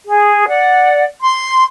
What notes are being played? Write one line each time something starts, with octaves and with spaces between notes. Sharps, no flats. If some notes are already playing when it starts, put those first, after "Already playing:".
G#4
D5 F#5
C6